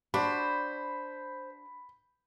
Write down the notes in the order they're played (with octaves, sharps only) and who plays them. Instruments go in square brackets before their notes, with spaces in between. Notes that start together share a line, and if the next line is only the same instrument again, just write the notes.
[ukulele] D4 F#4 [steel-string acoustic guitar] C5 [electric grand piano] B5